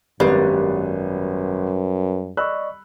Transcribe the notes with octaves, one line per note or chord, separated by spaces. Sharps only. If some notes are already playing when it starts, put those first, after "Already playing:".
G#1 F#2 G3 B3 B4 C7
D5 D#5 B5 C#6 E6 F#6